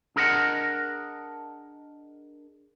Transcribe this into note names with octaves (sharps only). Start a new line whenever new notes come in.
D4 G#4 A#4 D#5 F#5